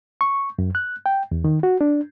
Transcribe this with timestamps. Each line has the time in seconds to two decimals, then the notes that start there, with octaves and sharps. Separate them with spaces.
0.21 C#6
0.59 F#2
0.75 F#6
1.06 G5
1.32 E2
1.44 D#3
1.63 F#4
1.81 D4